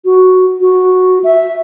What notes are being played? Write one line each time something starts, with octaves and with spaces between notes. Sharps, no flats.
F#4
F#4
E5